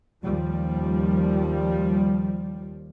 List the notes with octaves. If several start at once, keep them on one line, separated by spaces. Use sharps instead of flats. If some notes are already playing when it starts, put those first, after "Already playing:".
D#2 F3 G3